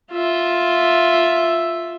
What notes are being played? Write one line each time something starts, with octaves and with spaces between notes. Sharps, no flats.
F4 E5